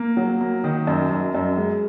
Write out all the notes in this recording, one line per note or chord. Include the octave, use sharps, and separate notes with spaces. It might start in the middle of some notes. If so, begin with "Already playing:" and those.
Already playing: A#3
F#3
A#3
D#3
F#2
F#2
F#2
G#3